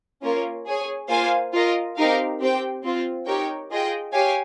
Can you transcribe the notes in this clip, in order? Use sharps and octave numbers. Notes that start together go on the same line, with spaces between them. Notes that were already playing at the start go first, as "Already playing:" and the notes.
A#3 C#4 F4 A#4 C#5
G#4 C#5 G#5
A#3 F4 C5 F5 G#5
F4 A#4 D#5
C4 D#4 G4 A#4 F5
C4 G4 C5 G5
C4 F4 C5
D#4 G4 A#4 C#5 G5
F4 G#4 D#5 G5
G4 C#5 F5 G#5